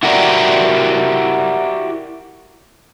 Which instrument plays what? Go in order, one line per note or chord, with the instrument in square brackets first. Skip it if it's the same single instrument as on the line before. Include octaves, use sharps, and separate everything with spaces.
[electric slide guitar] E4 F#4 G4 A#4 D5